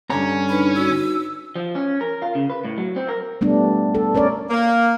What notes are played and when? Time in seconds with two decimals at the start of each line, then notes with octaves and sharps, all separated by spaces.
0.10 G2 D3 C#4 A#5
0.49 D4 D#4 B4 B5
0.75 D#4 F#4 E6
1.56 F3
1.75 C#4
2.01 A#4
2.22 F4
2.35 C#3
2.50 B4
2.64 A2
2.78 F#3
2.96 C4
3.09 A#4
3.41 G3 A3 B3 D4
3.95 A4
4.15 C#4 A#4 C#5 D5
4.50 A#3